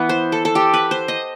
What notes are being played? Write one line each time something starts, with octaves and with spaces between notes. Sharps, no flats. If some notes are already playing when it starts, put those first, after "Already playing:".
Already playing: E3 B3
C5
A4
A4
G4
B4
C5
D#5